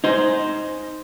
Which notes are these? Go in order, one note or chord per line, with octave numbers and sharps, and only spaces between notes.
D#4 C5